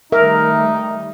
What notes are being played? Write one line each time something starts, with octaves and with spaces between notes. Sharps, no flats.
D#3 G3 A3 D#4 A#4 E5